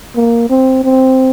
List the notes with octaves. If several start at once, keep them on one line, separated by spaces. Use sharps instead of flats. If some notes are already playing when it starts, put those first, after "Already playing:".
A#3
C4
C4